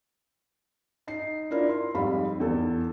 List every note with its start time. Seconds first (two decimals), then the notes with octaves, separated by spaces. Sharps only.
1.07 D#4 C7
1.51 D4 E4 F4 A#4 D5
1.69 C6
1.95 F2 G#2 G3 F5 B5
2.40 E2 A4